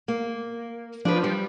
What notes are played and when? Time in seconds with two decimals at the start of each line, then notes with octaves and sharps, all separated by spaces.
0.08 A#3
1.05 F3 D4 B4
1.24 G3